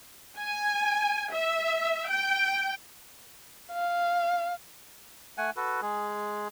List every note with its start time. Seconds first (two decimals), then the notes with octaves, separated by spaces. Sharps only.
0.38 G#5
1.32 E5
2.07 G5
3.73 F5
5.38 A3 F#5 G#5
5.57 F#4 A4 B4
5.82 G#3 G#4